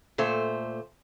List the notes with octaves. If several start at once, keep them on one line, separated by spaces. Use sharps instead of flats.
A#2 A3 C5